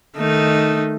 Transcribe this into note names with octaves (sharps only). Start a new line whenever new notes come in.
D#3 A3 D#4